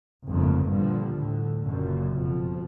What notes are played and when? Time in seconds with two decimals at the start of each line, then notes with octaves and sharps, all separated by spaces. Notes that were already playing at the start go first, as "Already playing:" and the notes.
0.29 G1 F2 G#2 C#3 A3 A#3
0.68 G2 A#2 D3 F3 G3
1.13 D2 A2 D3
1.63 F#1 F#2 A#2
2.18 F2 B2 F3